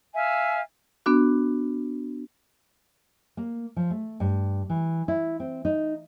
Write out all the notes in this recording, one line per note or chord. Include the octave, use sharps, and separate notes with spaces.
E5 F5 G#5
B3 D4 F#4
A#3
F3
A3
G2
E3
E4
C4
D#4